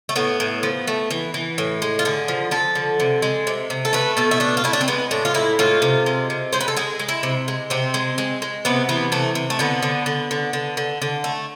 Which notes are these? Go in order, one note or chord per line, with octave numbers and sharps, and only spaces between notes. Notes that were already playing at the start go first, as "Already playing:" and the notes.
A3
A2 B3
A2
F3
A3
E3
E3
A2
G#3
F4
D3 G#4
F3
F3 A4
D3
C3
G#3
C3
C3
A4
A3 B4
B2 A4
E4
A3 D4
F4
A3 E4
D4
C4
G#3 B3
A2 D4
F4
G#3 E4
A2 F4
C3
G#3
C3
G#3 C5
B4
A4
G#3 G#4
G#3
E4
C3
G#3
C3 C4
G#3
G#3
G#3
C3 B3
E3 B3
C3 A3
C3
A3
D3 B3
D3
D3
D3
D3
D3
D3
A3